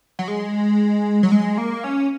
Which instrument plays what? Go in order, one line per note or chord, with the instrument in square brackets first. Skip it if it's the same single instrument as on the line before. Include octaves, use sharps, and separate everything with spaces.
[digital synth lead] F#3
G#3
F#3
G#3
A#3
C#4